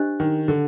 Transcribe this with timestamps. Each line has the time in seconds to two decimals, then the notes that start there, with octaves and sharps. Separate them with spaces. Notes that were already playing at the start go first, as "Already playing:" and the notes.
Already playing: D4 G4 C5 D#5
0.20 D#3
0.48 D3